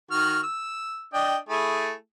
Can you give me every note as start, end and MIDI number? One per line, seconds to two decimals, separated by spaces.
0.11 0.40 51
0.11 0.40 66
0.11 0.40 89
0.43 1.07 88
1.14 1.37 62
1.14 1.37 75
1.14 1.37 79
1.49 1.93 57
1.49 1.93 64
1.49 1.93 68